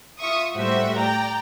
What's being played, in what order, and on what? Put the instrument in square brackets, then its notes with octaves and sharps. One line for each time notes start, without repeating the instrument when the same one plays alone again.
[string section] F4 E5 C#6 D#6
A2 G3 A3 F#4 C5 E5
D5 G5 A#5